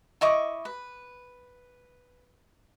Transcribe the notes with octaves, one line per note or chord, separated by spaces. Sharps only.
E4 D#5 C#6 D6
B4